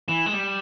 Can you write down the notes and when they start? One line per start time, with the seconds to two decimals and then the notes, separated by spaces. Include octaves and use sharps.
0.08 E3 E7
0.26 G#3
0.33 G3